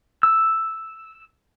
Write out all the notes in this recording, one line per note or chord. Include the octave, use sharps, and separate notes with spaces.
E6